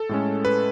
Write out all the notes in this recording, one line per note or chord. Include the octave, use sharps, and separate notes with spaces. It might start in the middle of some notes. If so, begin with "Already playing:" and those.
Already playing: A4
A2 G#3 C#4
B4